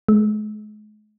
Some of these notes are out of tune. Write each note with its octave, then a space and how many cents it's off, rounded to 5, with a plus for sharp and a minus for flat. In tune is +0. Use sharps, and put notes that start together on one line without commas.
G#3 +35